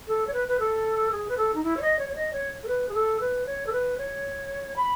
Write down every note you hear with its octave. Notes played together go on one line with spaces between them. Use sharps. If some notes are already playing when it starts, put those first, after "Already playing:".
A4
C#5
B4
B4
A4
G#4
B4
A4
D#4
E4
C#5
D#5
C#5
C#5
D#5
C#5
A4
B4
G#4
A4
B4
C#5
A4
B4
C#5
B5